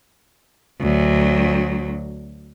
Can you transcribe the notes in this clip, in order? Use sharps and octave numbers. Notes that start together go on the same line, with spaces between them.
D2 F#3